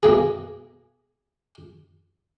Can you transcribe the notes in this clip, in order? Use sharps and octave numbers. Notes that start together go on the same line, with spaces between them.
B2 A#3 G#4